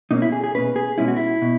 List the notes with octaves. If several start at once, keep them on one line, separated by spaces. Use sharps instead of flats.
B2 A#3 C#4 D#4
E4
G#4
G#4
B2 A#3 C#4 B4
G#4
B2 G#3 C#4 E4
F#4
E4
B2